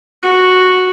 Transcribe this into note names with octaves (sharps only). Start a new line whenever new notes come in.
F#4